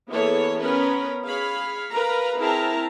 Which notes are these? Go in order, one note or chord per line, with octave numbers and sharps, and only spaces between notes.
E3 A#3 B3 G#4 A4 C#5
B3 C#4 A#4 B4
G#4 C#5 F5 B5
A#4 B4 F5 A#5
C4 E4 G#4 A#4 A5 A#5